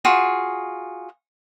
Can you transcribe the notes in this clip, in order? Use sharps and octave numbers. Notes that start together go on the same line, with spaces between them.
F4 F#4 G#4